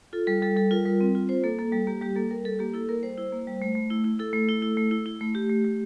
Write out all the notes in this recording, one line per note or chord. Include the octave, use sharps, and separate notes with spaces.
F4 A4
G3 A4
G3 A4
G3 A4
F4 A#4
G3
C4
F4
F4 C5
A#3 A4
A#3 A4
G3 A4
A#3 G4
G3 G4
A#3 A4
G3 A#4
G3 A4
A#3 G4
E4 A4
A#3 A#4
G3 C5
E4
A#3
G3
A3
A3
E4
E4
E4 A4
A3
E4
E4
A3
E4
E4
A3
A3 G4
A3
A3